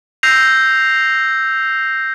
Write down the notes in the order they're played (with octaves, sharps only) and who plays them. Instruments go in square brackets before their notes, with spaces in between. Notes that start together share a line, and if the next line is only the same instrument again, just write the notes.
[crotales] E6 G6 A#6 C7 F7